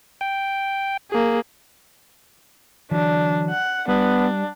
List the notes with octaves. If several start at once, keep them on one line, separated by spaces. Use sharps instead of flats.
G5
A#3 G#4
D3 E3 F#3 D4
F#5
G3 B3 D4